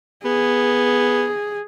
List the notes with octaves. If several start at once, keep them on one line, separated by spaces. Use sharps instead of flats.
B3 G#4